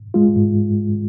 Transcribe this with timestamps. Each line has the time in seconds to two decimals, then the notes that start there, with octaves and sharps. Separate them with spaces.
0.14 G#3 F4
0.36 G#2